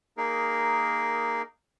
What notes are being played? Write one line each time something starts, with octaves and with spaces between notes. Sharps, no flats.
A#3 D#4 G#4 A#4